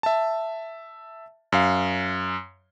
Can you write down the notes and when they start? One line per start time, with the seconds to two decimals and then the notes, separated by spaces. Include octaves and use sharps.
0.03 E5 A5
1.52 F#2 F5